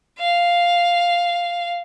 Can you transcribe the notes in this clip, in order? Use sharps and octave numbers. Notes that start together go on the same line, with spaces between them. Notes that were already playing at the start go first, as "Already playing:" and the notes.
F5